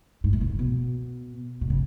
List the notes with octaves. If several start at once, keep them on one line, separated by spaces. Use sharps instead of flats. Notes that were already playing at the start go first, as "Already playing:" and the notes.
G#2
A2
B2
C#3
B2
B2
C#3